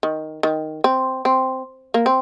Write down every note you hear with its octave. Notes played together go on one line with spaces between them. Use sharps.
D#3
D#3
C4
C4
A#3
C4